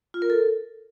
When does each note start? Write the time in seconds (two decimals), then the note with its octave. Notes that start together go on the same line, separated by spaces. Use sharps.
0.14 F4
0.22 A#4
0.30 A4